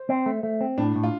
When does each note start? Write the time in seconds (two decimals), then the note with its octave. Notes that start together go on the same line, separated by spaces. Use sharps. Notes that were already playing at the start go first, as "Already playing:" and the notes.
Already playing: C5
0.09 C4
0.26 A3
0.43 A3
0.61 C4
0.78 A2 D4
0.96 A2
1.03 F4